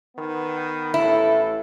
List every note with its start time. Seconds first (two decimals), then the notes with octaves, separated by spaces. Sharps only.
0.15 D#3 B3
0.94 A1 A2 E4 A4